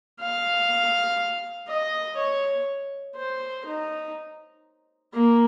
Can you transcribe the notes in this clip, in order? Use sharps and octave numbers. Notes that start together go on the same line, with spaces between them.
F5
D#5
C#5
C5
D#4
A#3